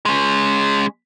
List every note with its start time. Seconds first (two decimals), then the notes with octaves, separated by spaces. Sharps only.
0.06 G#3 C#4